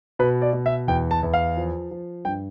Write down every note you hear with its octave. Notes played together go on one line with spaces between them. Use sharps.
B2 B4
D5
B2
E5
E2 G5
A5
E2
F5
F3
F3
G2 G5